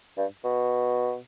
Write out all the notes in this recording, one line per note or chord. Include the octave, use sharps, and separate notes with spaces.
G2
B2